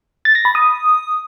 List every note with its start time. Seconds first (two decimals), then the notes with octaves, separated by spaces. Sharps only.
0.25 A6
0.35 A#6
0.45 B5
0.55 D#6